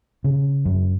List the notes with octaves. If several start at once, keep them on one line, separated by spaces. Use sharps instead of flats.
C#3
F#2